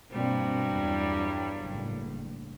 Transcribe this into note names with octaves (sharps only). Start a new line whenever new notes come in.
G2 B2 F#3 G3 A#3 C4
E2
F#1 A2